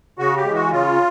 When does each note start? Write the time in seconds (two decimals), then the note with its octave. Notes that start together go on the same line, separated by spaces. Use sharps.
0.19 C#3 F#4
0.37 G4
0.45 E3 G#3
0.54 F#4
0.71 C#3 F4